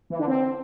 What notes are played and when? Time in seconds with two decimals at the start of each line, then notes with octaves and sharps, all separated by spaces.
0.10 E3
0.19 D3
0.28 C4